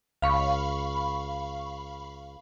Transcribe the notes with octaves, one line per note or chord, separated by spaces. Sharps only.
C#2 F5 B5 C#6